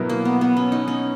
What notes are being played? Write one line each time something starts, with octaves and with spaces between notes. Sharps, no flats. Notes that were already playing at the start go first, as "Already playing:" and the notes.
Already playing: B2 F#3 B3 E4 A#4
A#3
B3
B3
C#4
D#4
C#4